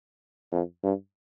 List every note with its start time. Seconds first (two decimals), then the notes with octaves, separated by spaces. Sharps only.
0.52 F2
0.83 G2